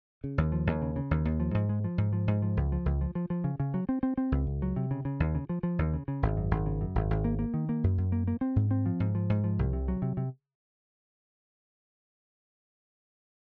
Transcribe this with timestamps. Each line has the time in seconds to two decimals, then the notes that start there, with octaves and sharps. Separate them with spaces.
0.24 C#3
0.38 D#2
0.52 F3
0.67 D#2
0.82 C#3
0.96 C#3
1.11 D#2
1.25 D#2
1.40 F3
1.54 G#2
1.69 G#3
1.84 F3
1.98 G#2
2.13 F3
2.28 G#2
2.42 F3
2.57 C#2
2.72 F3
2.86 C#2
3.01 F3
3.15 F3
3.30 F3
3.44 C#3
3.60 C#3
3.74 F#3
3.89 C4
4.03 C4
4.18 C4
4.32 C#2
4.47 C#2
4.62 F#3
4.76 C3
4.91 C#3
5.05 C#3
5.20 D#2
5.35 C#3
5.49 F3
5.63 F3
5.79 D#2
5.94 C#3
6.08 C#3
6.23 G#1
6.37 F#2
6.51 G#1
6.66 C#3
6.81 F#2
6.95 G#1
7.10 G#1
7.24 A#3
7.39 A#3
7.54 D#3
7.69 A#3
7.84 F#2
7.98 F#2
8.12 A#3
8.28 A#3
8.41 C4
8.56 G#2
8.71 C4
8.86 F3
9.00 G#2
9.15 F3
9.30 G#2
9.44 F3
9.59 C2
9.73 C3
9.88 F#3
10.02 C3
10.17 C3